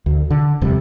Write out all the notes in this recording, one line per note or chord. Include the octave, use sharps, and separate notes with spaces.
D2
D3
D#1 F2 C3 G3